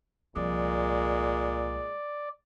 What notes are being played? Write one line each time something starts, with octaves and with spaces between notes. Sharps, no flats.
C2 A#2 F3 G#3 D5